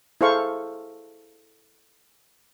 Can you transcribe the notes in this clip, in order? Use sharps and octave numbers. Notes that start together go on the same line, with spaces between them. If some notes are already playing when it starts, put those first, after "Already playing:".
E4 G#4 A4 C5 F5 C#6